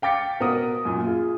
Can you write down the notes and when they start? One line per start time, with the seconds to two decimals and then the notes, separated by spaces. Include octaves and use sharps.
0.02 F5 G5 D6 A6 B6 C#7
0.40 B2 A#4 F#5 D#6
0.85 F#2 A#2
1.05 F4 G#4